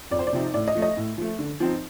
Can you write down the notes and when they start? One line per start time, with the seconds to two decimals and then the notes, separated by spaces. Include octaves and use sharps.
0.11 F2 D5
0.19 C5
0.27 D5
0.33 C3 F3 C4 D#4
0.54 A2 D5
0.68 D#5
0.75 F3 A3
0.82 D#5
0.97 A2
1.18 F3 A3
1.39 D3
1.60 F3 C4 D#4